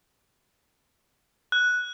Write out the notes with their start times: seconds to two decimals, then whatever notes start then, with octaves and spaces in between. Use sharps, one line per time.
1.52 F#6